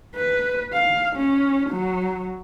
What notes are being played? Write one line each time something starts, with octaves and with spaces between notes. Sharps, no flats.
B4
F5
C#4
F#3